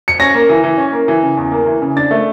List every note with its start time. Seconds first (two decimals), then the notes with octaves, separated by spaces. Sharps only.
0.08 C#7
0.20 C#4 A#6
0.34 A#3
0.49 E3
0.63 E3
0.78 C#4
0.93 A#3
1.08 E3
1.23 C#3
1.37 E2
1.52 A#3
1.66 E3
1.82 C#3
1.96 D4 A6
2.11 A3